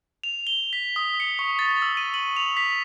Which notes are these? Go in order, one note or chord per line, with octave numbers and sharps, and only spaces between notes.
F7
G7
B6
D#6
C#7
C#6
A6
E6
D#7
F#7
F7
B6